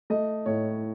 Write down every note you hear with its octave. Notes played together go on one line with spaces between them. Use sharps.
A3 D#5
A2 C#5